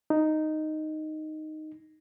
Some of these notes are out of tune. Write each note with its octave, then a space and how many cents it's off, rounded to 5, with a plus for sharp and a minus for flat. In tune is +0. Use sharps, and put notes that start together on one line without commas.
D#4 -5